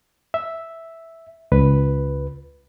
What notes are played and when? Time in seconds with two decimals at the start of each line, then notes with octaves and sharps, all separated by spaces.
0.34 E5
1.52 C#2 B4